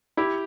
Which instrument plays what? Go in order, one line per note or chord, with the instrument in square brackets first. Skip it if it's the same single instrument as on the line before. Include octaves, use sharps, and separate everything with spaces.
[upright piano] E4 G4